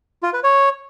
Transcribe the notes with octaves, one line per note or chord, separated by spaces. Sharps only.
F4
B4
C#5